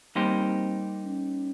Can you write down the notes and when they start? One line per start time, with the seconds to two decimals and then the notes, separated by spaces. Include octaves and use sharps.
0.15 G3 A#3 C4 D#4 G4 C5
1.05 C#4